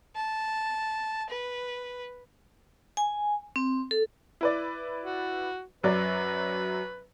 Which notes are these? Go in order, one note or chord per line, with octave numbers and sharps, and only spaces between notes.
A5
B4
G#5
C4
A4
E4 B4 D5
F#4
F#2 F#3 B4 D5